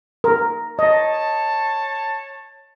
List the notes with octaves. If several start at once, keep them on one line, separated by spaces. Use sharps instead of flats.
A#4
C#5 D#5 A5